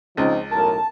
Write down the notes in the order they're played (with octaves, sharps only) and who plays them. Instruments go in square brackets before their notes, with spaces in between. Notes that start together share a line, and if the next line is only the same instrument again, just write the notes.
[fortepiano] C#2 [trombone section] F3 C4 D#4
[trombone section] B1 A2 A#4 [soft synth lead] A5